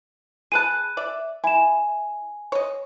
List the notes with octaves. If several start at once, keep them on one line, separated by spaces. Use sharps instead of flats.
G#4 B4 A5 F#6 D#7
D5 E5
E4 G#5 E7
C#5 D#5